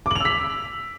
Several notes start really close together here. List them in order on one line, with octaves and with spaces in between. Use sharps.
D6 F#7 F7 E6 B6